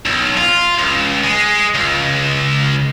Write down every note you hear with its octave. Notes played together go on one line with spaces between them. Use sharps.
B1
F4
C#2
G#3
C#2